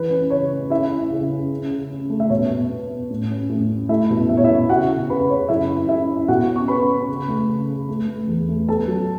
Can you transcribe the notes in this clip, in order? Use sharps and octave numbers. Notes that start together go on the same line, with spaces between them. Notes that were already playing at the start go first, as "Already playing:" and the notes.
Already playing: E3 B4
C#4
C#3 C#5
C#4
C#4 E4 E5
C#4
C#3
C#4
C#4
C#3
C#4
A3
E5
B2 C#5
B2
B3
B3
A2
C#4
A2
C#4
A3 E4 E5
B2
B2 E5
C#5
E4 E5
B2
C#3 F#4 F#5
C#3
C#3 B4 B5
C#3 C#5
F#2 E4 E5
C#4
C#4 E4 E5
C#4
B2 F#4 F#5
C#4
C#6
C#4 B4 B5
C#4
C#3
A3
C#3
C#3
A3
A3
E2
A3
B3 A4 A5
F#3